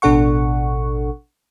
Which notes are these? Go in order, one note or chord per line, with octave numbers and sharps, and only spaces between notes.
A1 B2 D4 A4 F#5 C#6